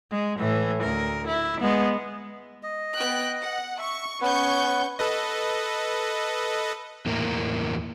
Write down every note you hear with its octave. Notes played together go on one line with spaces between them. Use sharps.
G#3
A2 E3
D2 A#4
E4
G#3 B3
D#5
B3 G5 F#6
F#5
E5 C#6
B3 C#4 B4 C#6 G6
A4 B4 D#5
E2 A2 A#3 E4 A#4